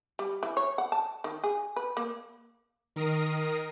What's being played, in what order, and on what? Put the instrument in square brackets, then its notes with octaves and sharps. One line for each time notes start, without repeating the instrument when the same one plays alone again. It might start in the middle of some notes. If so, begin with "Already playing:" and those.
[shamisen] G3
E3
C#5
F#5
A5
D#3
G#4
B4
A#3
[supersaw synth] D#3 A#4 D#6 A#6 C7